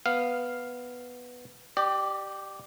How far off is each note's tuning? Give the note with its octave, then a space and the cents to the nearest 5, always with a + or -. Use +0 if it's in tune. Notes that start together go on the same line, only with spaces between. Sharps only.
B3 +0 F5 +0
G4 -10 D5 +30